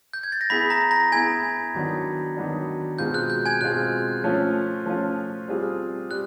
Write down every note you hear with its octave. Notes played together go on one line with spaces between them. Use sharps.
G6
G#6
A6
A#6
B3 E4 G#4 B5 B6
A#5 A#6
A#5 A#6
B3 E4 G#4 G#5 G#6
D#3 F#3 B3 D4
D#3 F#3 B3 D4
B2 G#3 C4 F4 G6
F#6
G6
G#5 G#6
B2 G#3 C4 F4 F#6
F3 A3 C#4 F4
F3 A3 C#4 F4
G3 C4 F4 G#4
G3 F#6